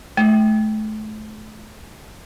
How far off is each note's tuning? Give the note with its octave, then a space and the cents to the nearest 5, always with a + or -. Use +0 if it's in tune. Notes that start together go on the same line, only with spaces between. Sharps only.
A3 -35